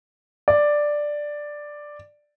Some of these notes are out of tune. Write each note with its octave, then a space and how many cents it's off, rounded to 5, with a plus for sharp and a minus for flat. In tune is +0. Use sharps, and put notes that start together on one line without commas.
D5 +5